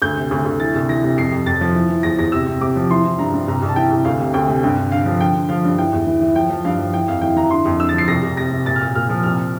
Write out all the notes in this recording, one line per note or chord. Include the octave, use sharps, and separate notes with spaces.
D2 G6
C3
D2
D2
E3 A6
C2
E3 A#6
C3
F2 C7
F2
F2 A6
F3
E3
E3
E2 A#6
E2 A#6
C3 E6
C3
C3 D6
F3
E3 C6
E3
G2 A#5
G2
C2 A#5
C2
A5
E3 G5
C2
D2 F5
C3
D2 G5
C3
G2 G5
D3
D3 F5
F3
D3 G5
D3
F3 F5
G2
E3 G5
E2
E3
E3
F3 G5
F3
G2 F5
F3
E3 G5
F2 F5
E3 G5
E3 A#5
D3 C6
F2
D3 E6
A6
F3 C7
C2 A#6
C2
C3 A#6
C3
A#2 A6
F6
A#2
A#2 F6
F3
C2 F6